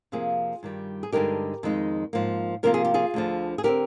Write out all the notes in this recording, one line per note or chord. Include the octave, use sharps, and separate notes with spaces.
F2 C3 F3 A#3 F4 G#4
G2 D#3 G3
G#4
G2 D3 G#3 D#4 G4 A#4
F2 D#3 G#3 D#4
G#2 F3 A#3
C3 F3 A#3 F4 A#4
G#4
G4
F4 G#4
D2 D3 F3
G#4
D3 G3 C4 G4 A#4